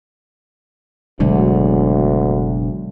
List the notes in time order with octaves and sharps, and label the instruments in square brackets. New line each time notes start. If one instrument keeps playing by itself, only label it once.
[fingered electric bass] F#1 B2 D3 [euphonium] D2 [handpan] F#3 G#3 F#4